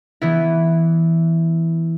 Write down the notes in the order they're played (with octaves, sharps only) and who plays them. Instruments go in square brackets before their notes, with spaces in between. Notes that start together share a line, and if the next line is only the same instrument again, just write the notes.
[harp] E3 B3 E4